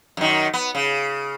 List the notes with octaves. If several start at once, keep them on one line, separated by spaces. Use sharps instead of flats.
F#2 D#3
B3
C#3